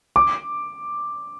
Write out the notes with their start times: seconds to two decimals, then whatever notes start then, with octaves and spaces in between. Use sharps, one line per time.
0.16 D6